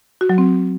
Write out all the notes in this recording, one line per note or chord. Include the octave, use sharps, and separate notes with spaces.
F#4
F#3
C4